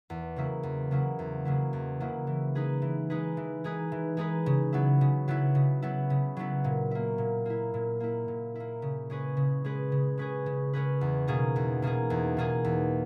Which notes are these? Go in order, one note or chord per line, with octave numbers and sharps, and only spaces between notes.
E2
C#3 F#3 A#3 E4
E2
C#3 F#3 A#3 E4
E2
C#3 F#3 A#3 E4
E2
C#3 F#3 A#3 E4
E3
G#3 D#4 G#4 B4
E3
G#3 D#4 G#4 B4
E3
G#3 D#4 G#4 B4
E3
G#3 D#4 G#4 B4
C#3
F#3 B3 E4
C#3
F#3 B3 E4
C#3
F#3 B3 E4
C#3
F#3 B3 E4
A#2
A#3 E4
A#2
A#3 E4
A#2
A#3 E4
A#2
A#3 E4
C#3
G#3 C#4 G#4 B4
C#3
G#3 C#4 G#4 B4
C#3
G#3 C#4 G#4 B4
C#3
G#3 C#4 G#4 B4
E2
B2 A#3 D#4 G#4
E2
B2 A#3 D#4 G#4
E2
B2 A#3 D#4 G#4
E2